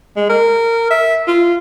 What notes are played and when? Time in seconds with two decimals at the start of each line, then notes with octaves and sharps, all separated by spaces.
0.16 G#3
0.29 A#4
0.90 E5
1.27 F4